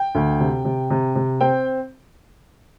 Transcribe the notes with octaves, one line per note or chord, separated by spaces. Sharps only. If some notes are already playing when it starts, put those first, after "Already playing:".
Already playing: G5
D2
C3
C3
C3
C3
C4 G5